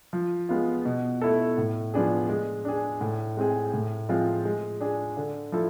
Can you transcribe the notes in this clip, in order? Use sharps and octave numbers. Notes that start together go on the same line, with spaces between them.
F3
G#3 B3 F4
B2
A3 E4 A4
A2
F3 B3 D4 G#4
G#3
D4 G#4
A2
G#3 C4 G#4
A2
F3 G#3 C4 F4
G#3
D4 G#4
D3
F3 A3 E4 A4